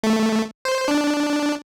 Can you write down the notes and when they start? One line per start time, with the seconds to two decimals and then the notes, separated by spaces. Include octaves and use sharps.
0.03 A3
0.65 C5
0.88 D4